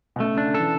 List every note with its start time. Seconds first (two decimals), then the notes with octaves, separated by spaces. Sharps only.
0.16 B2
0.20 C#3 A3
0.34 C#3 D4
0.47 D3
0.54 A4
0.60 E3